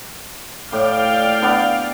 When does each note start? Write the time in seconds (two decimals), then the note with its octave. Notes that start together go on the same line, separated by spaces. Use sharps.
0.72 A2 D5 F5 G5 D6
1.42 B3 D4